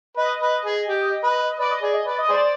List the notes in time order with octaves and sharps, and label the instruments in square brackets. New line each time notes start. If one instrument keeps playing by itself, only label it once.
[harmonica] B4 [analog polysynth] D#5
[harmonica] B4
G#4
G4
B4
[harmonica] B4 [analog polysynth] D5
[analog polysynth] D#5
[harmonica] G#4 [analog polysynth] D5
[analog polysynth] D#5
[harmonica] B4 [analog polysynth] D5
[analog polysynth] D#5
[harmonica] G#4 C5 [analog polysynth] D5